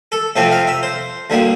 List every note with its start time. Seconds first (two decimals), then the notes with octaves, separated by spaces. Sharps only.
0.12 A4
0.36 F2 C3 F3 A3 C4
0.51 F5
0.67 E5
0.83 C5
1.30 D2 D3 G3 A#3